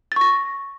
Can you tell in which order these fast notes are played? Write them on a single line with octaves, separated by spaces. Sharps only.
A6 C#6 A#6